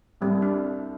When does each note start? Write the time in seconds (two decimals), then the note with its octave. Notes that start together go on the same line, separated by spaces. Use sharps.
0.21 C2 C3 G3
0.42 D4